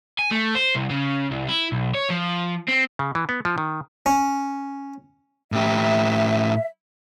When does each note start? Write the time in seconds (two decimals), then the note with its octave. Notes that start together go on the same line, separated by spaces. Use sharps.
0.19 G#5
0.31 A3
0.55 C5
0.75 C2
0.90 C#3
1.31 C2
1.49 E4
1.72 B1
1.94 C#5
2.10 F3
2.69 C4
2.99 C#3
3.15 E3
3.29 B3
3.45 F3
3.58 D#3
4.06 C#4
5.52 A2 G4 E5